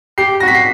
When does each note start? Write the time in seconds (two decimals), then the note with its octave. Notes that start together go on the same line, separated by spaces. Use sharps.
0.18 G4 C7
0.40 F#4 A#6
0.48 B6
0.55 C7